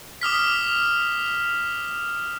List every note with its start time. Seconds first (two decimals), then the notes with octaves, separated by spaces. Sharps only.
0.21 D6 D#6 F6 B6